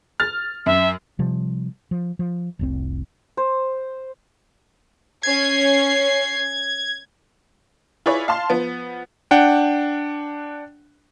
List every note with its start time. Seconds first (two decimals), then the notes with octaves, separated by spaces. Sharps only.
0.20 F6 A6
0.66 F#2 E5
1.19 C3 F3 G3
1.91 F3
2.19 F3
2.59 F1 C2 C4
3.37 C5
5.23 C#4 G#6 C7
8.06 E4 F4 G#4 B4 C#5 D5
8.28 F5 A5 C6
8.50 F3 B3
9.31 D4 F#5 G5